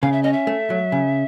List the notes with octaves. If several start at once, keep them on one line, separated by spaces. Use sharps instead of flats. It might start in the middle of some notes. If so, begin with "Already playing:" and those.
C#3 F5
E5
C#4 D#5
E5
A3
F#3
C#3